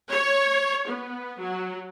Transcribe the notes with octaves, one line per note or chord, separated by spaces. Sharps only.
C#5
B3
F#3